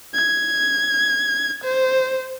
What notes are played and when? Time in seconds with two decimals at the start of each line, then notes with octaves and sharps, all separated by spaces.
0.14 G#6
1.64 C5